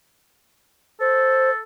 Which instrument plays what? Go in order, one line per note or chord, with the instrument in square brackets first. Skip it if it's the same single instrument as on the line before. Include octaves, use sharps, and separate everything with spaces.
[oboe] A4 [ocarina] C5